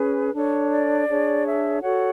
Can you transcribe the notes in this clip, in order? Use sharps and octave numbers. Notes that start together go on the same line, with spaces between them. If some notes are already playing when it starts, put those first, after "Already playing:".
Already playing: C#4 G#4 B4
D4 A4 C#5
D5
D4 G#4 C#5
E5
F#4 A4 C#5 F#5